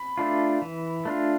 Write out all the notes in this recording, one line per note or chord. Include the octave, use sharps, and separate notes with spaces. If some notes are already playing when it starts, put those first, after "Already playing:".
Already playing: B5
A3 D4 F4
E3
A3 D4 F4